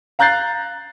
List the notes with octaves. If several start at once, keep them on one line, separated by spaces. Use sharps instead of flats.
F5 A#5 F#6 G6 A6 C7